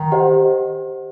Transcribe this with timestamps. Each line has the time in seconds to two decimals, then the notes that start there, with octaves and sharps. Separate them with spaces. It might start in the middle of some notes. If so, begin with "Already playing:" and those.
Already playing: D#3
0.12 G4 C5 D#5 F#5